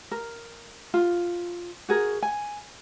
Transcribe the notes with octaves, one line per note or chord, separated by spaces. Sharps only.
A#4
F4
F#4 G#4 A#4
G#5